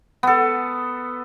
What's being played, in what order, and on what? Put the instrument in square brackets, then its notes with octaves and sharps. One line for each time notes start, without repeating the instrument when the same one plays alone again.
[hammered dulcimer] B3 A4